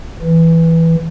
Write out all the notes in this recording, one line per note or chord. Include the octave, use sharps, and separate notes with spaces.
E3